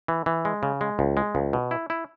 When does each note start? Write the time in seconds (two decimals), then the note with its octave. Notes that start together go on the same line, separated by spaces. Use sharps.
0.08 E3
0.26 E3
0.45 G#3
0.63 C#3
0.81 G#3
0.99 C#2
1.17 G#3
1.35 C#2
1.53 B2
1.71 E4
1.90 E4